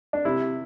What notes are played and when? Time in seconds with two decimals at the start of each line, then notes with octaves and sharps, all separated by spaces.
0.13 D4
0.25 C3 E4